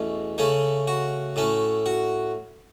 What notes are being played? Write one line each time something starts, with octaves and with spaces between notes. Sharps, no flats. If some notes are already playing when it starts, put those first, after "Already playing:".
Already playing: E2 B2 A3 C#4
C#3 A3 C#4
F#4
A2 A3 C#4
F#4